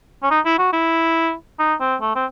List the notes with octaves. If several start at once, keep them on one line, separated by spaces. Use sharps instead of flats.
C#4
D#4
E4
F#4
E4
D#4
C4
A3
C4